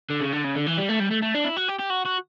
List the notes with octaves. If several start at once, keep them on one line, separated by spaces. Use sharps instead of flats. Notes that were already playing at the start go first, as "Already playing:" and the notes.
D3
C#3
D3
C#3
D3
E3
G3
A3
G3
A3
A3
D4
E4
F#4
G4
G4
F#4
F#4